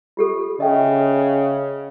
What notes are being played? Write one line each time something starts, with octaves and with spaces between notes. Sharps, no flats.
F4 G4 A4
C#3 D#5 E5 G5